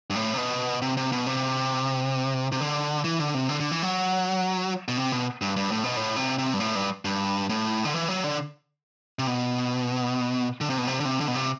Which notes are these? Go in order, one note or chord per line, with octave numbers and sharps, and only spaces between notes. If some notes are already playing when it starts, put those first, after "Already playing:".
G2
A2
C3
B2
C3
C3
B2
C3
C3
D3
E3
D3
C3
D3
D3
E3
F#3
B2
C3
B2
G2
G2
A2
B2
A2
C3
C3
G2
A2
G2
G2
A2
D3
E3
F#3
D3
C3
B2
D3
C3
B2
C3
D3
C3
D3
B2
C3